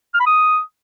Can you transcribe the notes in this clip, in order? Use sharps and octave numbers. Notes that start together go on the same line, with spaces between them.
F6
B5
D#6